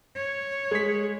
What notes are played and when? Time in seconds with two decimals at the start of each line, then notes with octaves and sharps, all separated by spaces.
0.15 C#5
0.71 G#3 B6